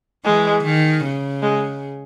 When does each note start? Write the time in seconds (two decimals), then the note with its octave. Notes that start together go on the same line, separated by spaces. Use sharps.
0.25 E3 G#3
0.64 D#3
1.04 C#3
1.42 G#3